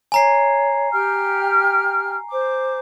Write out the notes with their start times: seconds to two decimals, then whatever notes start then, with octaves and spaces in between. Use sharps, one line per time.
0.12 C#5 G#5 A#5 C7
0.92 G4 G5 F6
2.29 C5 D6